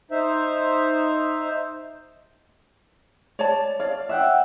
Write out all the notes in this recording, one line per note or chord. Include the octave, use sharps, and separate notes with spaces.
D#4 C5 E5
C#5 D5 A5
C#5 D5 F5
E5 F#5 G5